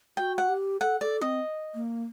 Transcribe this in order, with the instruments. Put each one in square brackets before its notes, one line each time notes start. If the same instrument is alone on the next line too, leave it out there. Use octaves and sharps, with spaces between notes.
[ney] F#4 [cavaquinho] G5
[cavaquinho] F#5
[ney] G4
[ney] A4 [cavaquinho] F#5
[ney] A4 [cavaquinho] D5
[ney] C4 [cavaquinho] D#5
[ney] A#3